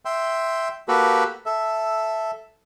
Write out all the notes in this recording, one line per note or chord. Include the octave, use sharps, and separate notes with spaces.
E5 G5 C6
A#3 F#4 G4 A4 B4
A4 E5